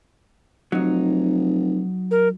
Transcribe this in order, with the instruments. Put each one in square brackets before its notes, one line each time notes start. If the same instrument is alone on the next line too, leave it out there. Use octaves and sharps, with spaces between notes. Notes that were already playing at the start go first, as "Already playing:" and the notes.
[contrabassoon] F1 [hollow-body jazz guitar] F#3 D#4
[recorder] A#4